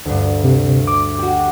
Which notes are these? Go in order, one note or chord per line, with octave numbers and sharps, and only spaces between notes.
D2 G2
C3
D6
F#4 G4